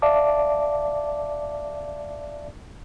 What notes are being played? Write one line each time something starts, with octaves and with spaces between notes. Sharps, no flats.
D5 E5 F5 A5 D6